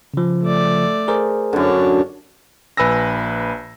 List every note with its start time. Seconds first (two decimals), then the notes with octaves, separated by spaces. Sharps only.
0.14 C#3 F3
0.42 A3 D5
1.08 G#4 A#4 C5
1.53 F#2 D3 D4 C#5
2.77 A#1 B4 G#5 E6 A#6